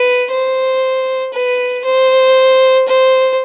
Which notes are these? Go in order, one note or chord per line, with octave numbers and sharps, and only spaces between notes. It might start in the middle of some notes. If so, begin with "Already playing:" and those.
Already playing: B4
C5
B4
C5
C5